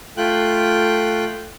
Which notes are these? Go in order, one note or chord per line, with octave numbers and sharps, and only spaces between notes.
A3 F4 G5 F#6